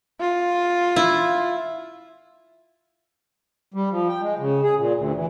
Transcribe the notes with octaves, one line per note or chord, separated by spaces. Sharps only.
F4
E4
G3
F3
G5
G#3
C#3
G#4
A#2
D2
E3